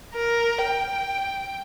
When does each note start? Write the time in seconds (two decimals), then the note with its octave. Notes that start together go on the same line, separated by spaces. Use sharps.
0.15 A#4
0.58 G5